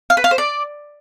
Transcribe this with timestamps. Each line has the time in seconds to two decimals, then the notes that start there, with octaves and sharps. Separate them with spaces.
0.10 F5
0.17 B4
0.24 F5
0.31 C5
0.38 D5